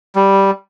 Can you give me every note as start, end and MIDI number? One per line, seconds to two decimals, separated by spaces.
0.16 0.51 55